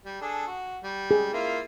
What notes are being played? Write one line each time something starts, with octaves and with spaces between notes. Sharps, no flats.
G3
D4 G#4 A4
F#4
G3
G#4
A#3 E4 F4